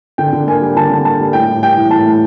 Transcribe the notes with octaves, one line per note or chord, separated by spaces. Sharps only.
D3 G5
D3
A#3 G#5
G3
D3 A5
D3
A#3 A5
G3
A2 G5
A2
G3 G5
E3
A2 A5
A2